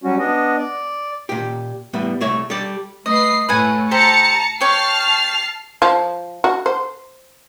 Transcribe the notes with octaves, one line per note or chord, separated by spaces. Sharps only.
F#3 G3 C#4 F#4
B3 D4 D#5
D5
A#2 G4
A2 G3 B3
C2 A3 C#5
G3 A4 D5
A3 B4 D#5 C7
A2 A3 B4 F#5 G#5
G4 A4 C5 A5 A#5 C#7
G4 C#5 A5 C#6 F6 C7
F3
F#4
C5